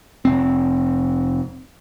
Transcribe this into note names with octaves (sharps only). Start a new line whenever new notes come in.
F1 C4